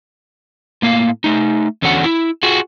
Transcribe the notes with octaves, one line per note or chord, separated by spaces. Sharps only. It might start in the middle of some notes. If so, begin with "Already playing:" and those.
A2 A#3 F5
A3 D#4
E2 D3 C#4 F#4 F#5
E4
F4 F#4 G#4